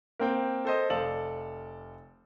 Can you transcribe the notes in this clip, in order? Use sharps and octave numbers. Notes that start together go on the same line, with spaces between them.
A#3 C4 G5
A4 C5 D#5
F1 A4 D5 F5 F#7